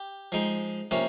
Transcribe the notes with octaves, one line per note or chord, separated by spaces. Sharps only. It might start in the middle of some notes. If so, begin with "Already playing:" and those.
Already playing: G4
F3 G#3 D#4
C3 F3 A#3 C#4